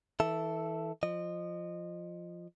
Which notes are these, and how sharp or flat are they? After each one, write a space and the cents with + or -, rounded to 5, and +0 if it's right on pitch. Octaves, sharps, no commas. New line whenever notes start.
E3 -25 A4 +0 E5 +0
F3 +0 D#5 -25